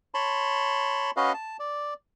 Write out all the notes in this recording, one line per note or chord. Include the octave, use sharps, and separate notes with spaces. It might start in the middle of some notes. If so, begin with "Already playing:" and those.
C#5 A5 B5 C6
C#4 F#4 B4 D#5 F5
A5
D5